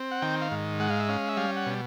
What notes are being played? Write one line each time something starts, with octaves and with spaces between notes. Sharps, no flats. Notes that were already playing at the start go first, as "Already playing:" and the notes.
Already playing: C4
F#5
D#3 G5
F5
G#2
G#3 F#5
F5
E5
C#4 F5
E5
G3 F5
F#5
B2